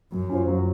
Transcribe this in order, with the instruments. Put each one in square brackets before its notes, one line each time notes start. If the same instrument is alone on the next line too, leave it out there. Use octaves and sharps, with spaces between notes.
[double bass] F#2 [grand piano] F#3
[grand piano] C#4 F4 C5
F#3